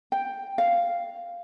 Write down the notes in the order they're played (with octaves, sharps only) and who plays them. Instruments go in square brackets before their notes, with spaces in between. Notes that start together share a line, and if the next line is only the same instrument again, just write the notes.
[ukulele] G5
F5